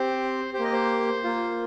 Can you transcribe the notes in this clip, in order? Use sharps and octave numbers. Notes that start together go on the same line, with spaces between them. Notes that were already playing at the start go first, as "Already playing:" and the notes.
Already playing: C4 G4 C5
G4 C5
A#3 D#5
C5
A#3 F4